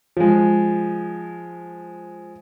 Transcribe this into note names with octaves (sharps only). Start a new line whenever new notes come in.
F3 G#3